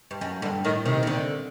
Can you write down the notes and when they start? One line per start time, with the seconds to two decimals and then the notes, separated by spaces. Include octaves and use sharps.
0.11 G2
0.21 F#2
0.42 G2 D3
0.64 A2 D#3
0.85 C3 D#3
1.03 C3
1.07 D3